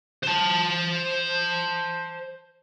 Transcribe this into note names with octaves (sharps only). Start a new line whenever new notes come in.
C5 A5